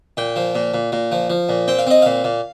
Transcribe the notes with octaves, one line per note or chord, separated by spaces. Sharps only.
A#2 G5
F3
A#2
A#2
A#2
F3
F3
A#2
C4 G5
F5
C4 D#5
A#2 F5
A#2